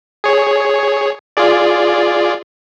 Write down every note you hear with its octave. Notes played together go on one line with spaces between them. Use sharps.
G#4 C#5
F4 G#4 D5